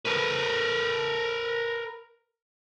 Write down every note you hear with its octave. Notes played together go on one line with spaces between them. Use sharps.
A#4 B4